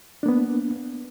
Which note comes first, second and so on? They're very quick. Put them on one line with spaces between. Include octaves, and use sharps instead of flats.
D4 A#3 B3